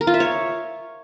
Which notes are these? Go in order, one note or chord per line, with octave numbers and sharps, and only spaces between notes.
A#4
F4
E5
C#5